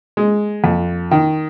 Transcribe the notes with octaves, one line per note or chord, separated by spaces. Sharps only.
G#3
F2
D#3